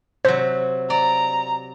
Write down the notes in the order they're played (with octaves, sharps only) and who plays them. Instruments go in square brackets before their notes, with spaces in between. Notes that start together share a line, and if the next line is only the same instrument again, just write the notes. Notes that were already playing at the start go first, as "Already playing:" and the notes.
[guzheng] C3 F#3 [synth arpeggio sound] C5
[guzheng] D5 [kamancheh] A#5